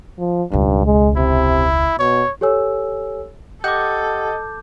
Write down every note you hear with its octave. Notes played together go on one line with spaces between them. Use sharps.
F3
E1 C#2 G2
G#3
C3 E4
B2 C#5
G4 A4 C#5 G#5 E6
G4 A4 D#5 F#5 D6 G6